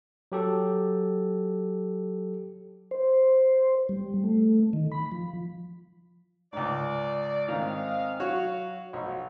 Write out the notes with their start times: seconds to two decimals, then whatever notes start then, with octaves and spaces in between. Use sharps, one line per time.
0.32 F#3 G4 A4
2.91 C5
3.89 G3
4.24 A3
4.73 D#3
4.92 B5
5.12 F3
6.53 C#2 G#2 D5
7.48 G#2 D#3 C4 C#4 D#5 F5
8.20 F#3 F#4 C#5 F5
8.93 B1 F3 C#5